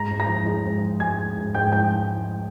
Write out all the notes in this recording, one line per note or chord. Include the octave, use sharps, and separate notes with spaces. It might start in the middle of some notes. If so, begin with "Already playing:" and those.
Already playing: G#2 A#5 A#6
G#2
A#5 A#6
F3
G#3
G#2
F3
G#2 G#5 G#6
G#3
G#2
G#2 G5 G6
F3 G5 G6